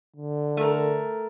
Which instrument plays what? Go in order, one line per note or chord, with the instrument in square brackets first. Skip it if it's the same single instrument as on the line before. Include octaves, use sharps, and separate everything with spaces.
[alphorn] D3
[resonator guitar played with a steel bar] A3 A#4